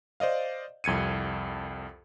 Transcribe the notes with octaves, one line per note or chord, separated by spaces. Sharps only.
C5 D5 D#5 F5
C2 F2 G#6 C#7 D#7